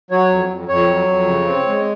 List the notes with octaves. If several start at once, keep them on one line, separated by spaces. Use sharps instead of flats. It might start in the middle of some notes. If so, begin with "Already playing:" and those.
F#3 C#5
F2
F2
F2 C#5
F#3
F2
C#3
C4
G#3